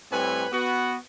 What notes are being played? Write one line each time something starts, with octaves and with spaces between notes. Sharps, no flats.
A2 G3 C4 B4 C#5 G#5
B3 F#4